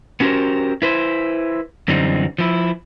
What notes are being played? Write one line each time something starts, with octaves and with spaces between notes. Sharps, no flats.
B3 C#4 F#4 G4 A#4 C5
E4 B4 C5
F#2 D3 E3 G3 C4 D#4
F3 E4